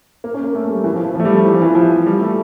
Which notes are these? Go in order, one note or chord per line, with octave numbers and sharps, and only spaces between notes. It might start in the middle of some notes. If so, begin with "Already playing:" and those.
A#3
C#4
A#3
A3
G3
E3
F3
F3
F3
A3
G3
F3
E3
F3
E3
F3
G3
A3